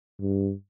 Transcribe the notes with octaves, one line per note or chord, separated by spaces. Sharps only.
G2